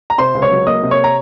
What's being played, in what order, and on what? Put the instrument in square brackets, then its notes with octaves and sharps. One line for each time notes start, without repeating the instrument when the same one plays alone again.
[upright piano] A#5
C3 C5 C6
C#2
C#5 C#6
F#3
A#3 D#5 D#6
C3
C#5 C#6
A#5